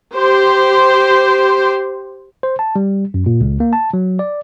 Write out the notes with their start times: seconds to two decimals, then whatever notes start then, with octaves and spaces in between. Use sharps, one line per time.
0.16 G4 C5
2.43 C5
2.59 A5
2.76 G3
3.14 F#2
3.26 A#2
3.41 C#2
3.60 A#3
3.73 A5
3.93 F#3
4.19 D5